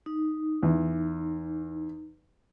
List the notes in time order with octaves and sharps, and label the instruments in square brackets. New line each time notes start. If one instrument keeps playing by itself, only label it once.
[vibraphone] D#4
[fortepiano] E2